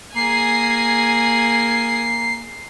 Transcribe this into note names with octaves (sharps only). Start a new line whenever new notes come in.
A#3 G#4 G#5 C7